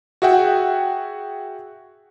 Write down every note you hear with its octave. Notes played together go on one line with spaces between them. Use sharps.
F#4 G#4 E5 F#5 G5